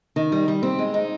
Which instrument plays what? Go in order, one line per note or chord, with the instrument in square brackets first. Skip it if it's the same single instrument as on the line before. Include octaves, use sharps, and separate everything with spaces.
[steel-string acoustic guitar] D#3
G3
G3
C4
G#3
D#4